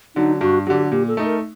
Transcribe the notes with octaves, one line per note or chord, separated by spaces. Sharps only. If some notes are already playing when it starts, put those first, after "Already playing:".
D3 F#3 D#4
G2 F#4
D3 F#3 G4
A#2 G4
A4
A3 D#4
A#4